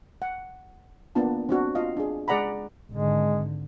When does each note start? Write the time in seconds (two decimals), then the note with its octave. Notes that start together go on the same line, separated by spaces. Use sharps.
0.22 F#5
1.15 A#3 B3 D4 F4 A5
1.49 C4 D4 F#4
1.75 F4 D#5 F5
1.97 D4 G#4
2.28 G#3 G#4 D5 F#5 A#5 B5
2.92 G#1 D3 G#3